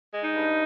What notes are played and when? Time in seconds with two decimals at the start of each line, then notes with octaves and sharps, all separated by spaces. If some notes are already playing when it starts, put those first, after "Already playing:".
0.12 G#3
0.24 D#4
0.35 G2